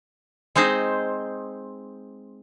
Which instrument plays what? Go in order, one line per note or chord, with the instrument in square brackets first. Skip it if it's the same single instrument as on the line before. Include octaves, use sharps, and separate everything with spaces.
[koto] G#3 C4 D#4 C5